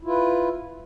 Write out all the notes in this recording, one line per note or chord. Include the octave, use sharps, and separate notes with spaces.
E4 F4 B4